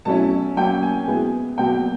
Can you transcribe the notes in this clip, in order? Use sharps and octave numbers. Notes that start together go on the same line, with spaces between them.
B2 F#3 A3 C#4 E4 A5
F#3 A#3 C#4 G5
G#5
B2 G#3 B3 E4
B2 F#3 A#3 G5